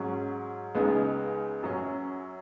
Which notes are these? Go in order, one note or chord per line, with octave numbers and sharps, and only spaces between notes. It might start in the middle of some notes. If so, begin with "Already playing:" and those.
Already playing: G#2 F#3 C#4
C#2 C#3 G#3 B3 D#4
F#2 F#3 C#4